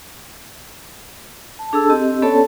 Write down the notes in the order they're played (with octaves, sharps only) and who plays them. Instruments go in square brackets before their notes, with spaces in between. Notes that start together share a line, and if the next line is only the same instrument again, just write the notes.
[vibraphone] A5
D4 G#4 A4 A5 E6
C4 G4 D#5
B3 C#4 A4 C#5 D5 A5